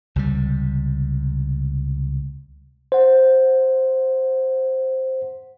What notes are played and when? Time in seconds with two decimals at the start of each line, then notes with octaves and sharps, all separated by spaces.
0.16 C#2 C3 G3
2.92 C5 F#5